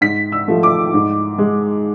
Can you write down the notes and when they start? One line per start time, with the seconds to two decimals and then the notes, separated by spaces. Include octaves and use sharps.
0.01 G#2 B6
0.32 E6
0.48 F3 A3
0.63 D6
0.94 G#2
1.38 G#3